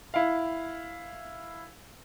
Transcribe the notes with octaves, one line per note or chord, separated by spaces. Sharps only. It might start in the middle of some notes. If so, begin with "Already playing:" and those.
E4 F5